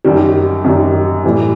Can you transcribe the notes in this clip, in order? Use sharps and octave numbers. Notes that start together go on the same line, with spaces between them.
F#2 D#3 G3
F#2 D#3 G3
A2 E3 G3